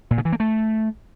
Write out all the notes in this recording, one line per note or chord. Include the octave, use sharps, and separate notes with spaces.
A#2
C#3
E3
A#3
A3